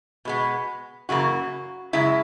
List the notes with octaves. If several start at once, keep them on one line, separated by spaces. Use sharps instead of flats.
B2 G#3 B3
F#2 C#3 E3 A#3 F#4
F#2 C#3 G#3 E4